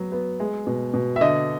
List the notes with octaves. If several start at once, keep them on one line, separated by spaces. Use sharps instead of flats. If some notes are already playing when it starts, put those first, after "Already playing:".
Already playing: F#3 B3
B3
G#3
B2
B2
E5
D3 D#5